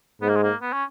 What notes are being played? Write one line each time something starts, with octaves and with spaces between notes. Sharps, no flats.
G#2 B3
A#3
G#3
A#3
B3
C#4